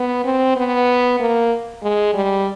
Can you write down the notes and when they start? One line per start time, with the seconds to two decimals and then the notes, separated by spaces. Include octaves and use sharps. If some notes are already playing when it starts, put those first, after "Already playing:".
Already playing: B3
0.25 C4
0.56 B3
1.20 A#3
1.83 G#3
2.14 G3